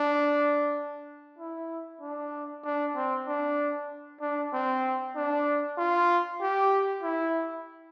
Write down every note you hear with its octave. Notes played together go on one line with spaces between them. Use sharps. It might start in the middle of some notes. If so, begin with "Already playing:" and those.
Already playing: D4
E4
D4
D4
C4
D4
D4
C4
D4
F4
G4
E4